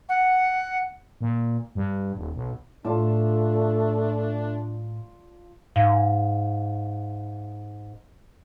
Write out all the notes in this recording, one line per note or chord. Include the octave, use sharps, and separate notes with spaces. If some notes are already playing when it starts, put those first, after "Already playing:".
F#5
A#2
G2
D#1
B1
A2 A3 D4 F4 D5 A5
G#2 F5